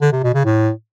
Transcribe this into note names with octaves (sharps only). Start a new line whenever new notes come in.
D3
C3
B2
C#3
A2